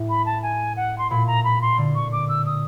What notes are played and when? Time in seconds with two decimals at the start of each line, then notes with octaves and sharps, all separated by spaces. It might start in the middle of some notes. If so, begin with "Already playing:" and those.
Already playing: A2
0.09 B5
0.26 A5
0.43 G#5
0.77 F#5
0.98 C6
1.10 A#2 B5
1.27 A#5
1.44 B5
1.62 C6
1.78 D3
1.95 C#6
2.12 D6
2.29 E6
2.46 D#6